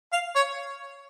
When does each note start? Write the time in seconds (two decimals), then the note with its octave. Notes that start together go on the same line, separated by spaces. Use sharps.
0.12 F5
0.36 C#5